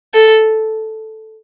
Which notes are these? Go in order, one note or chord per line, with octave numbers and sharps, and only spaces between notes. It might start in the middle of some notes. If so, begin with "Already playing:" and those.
A4